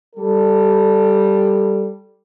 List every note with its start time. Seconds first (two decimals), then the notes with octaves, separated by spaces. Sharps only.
0.15 G3 A4